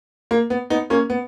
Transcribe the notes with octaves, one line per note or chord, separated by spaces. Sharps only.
A#3
B3
B3 D#4
A#3 C#4
B3